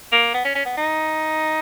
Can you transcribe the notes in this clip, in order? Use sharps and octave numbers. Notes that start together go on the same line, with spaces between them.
A#3
B3
C#4
C#4
B3
D#4